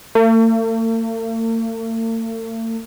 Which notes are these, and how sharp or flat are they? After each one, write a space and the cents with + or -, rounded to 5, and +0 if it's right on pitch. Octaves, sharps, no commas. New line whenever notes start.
A3 +45